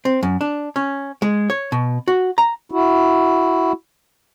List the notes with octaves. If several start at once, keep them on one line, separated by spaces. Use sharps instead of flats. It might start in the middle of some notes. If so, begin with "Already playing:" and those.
C4
F#2
D4
C#4
G#3
C#5
B2
F#4
A#5
E4 F#4